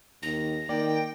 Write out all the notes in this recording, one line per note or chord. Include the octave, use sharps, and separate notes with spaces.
D#2 A#6
D#3 A#3 D5 G5